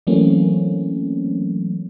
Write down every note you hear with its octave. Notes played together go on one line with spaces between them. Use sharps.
E3 F#3 A3 A#3 C4 C#4